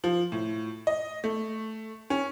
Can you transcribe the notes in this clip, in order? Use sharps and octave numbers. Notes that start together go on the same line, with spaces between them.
F3
A2
D#5
A3
C#4